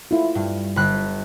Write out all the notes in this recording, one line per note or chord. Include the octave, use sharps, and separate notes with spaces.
E4 F4
G2
G1 B5 F#6